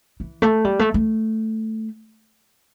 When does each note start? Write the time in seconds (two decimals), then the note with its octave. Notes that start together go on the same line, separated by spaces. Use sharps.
0.20 E3
0.42 A3
0.65 G3
0.79 A3
0.94 A3